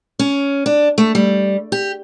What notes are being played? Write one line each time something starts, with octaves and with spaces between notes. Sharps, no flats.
C#4
D4
A3
G3
G4